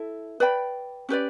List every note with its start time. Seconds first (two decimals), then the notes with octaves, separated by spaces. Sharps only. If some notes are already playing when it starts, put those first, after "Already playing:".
Already playing: E4 A4 E5
0.40 B4 D5 G5 B5
1.09 C#4 G4 B4 D5